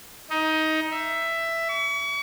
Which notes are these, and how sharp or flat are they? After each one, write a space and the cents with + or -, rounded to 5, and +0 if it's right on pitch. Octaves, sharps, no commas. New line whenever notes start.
D#4 +15
E5 +10
C#6 +40